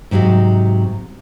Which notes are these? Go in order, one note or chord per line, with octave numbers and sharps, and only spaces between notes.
G#2 C3 F#3 D#4 F#4